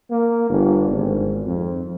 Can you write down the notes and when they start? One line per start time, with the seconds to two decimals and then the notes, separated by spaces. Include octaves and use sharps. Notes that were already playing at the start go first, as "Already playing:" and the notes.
0.11 A#3
0.50 G1
0.90 G#1
1.48 F2